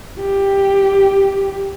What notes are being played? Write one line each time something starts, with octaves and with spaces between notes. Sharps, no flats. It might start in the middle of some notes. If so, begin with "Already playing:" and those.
G4